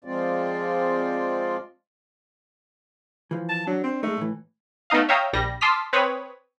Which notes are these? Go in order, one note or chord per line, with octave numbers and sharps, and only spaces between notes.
F3 G#3 C4 F4 D5
E3 F3
A5
F#3 D4
C4
G#3 A3 D#4
A2 E3
A3 B3 D#4 D#5 F5
C#5 E5 F5 G5 A#5 D#6
A#1 G3 A#6
A5 C6 D6 D#6 F6 B6
C4 B4 C#5 B5 D#6